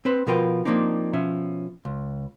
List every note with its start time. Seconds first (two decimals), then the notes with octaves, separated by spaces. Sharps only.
0.05 C4 B4 C5
0.27 B2 F3 F4 A#4 B4 G5
0.65 F3 F#3 A#3 C4 D4 D#4
1.13 B2 F3 C#4 E5
1.85 C#2